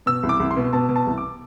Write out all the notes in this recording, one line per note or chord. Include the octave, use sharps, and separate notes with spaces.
B2 E6
C2
D6
C2
C6
B2
B2 A5
B2
A5
C2
D6